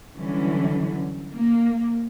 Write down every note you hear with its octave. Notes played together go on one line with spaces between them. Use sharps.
D3 E3 F#3 G3 C#4
A#3